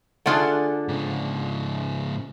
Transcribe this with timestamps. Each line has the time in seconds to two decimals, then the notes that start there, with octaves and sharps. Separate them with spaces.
0.26 D3 A3 F4 G#4 D5 F#5
0.88 G#2 C#3